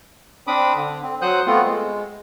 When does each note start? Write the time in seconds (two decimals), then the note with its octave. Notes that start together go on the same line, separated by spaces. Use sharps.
0.47 C4 D4 B5 D6 D#6
0.76 D3
1.03 C4
1.22 F#3 C5 F#5 D#6 F#6 G6
1.47 A3 B3 C4 F4
1.65 G#3